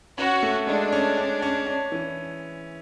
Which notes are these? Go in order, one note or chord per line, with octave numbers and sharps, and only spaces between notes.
C#4 F#4
A3
G#3 D4
C#4
C#4
C#4
C#4
E3